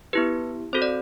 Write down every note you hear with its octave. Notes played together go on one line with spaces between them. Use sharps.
B3 E4 G4 B4
C4 F#4 A4 C5
D5